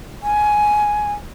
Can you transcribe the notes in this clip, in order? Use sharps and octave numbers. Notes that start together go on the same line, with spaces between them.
G#5